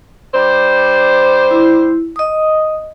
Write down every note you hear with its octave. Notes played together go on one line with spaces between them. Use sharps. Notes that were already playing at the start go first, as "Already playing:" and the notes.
G3 D4 C5
E4
D#5 D#6